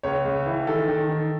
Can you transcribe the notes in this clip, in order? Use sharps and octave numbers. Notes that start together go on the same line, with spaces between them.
C#2 C#5
C#2
E3
D#3 A4
D#3
D#3